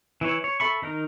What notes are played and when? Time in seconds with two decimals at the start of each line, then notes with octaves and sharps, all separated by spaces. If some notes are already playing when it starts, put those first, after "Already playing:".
0.21 E3 E4 C#5
0.44 C#5
0.60 A4 E5 B5 C#6
0.82 D#3 D#4 A#4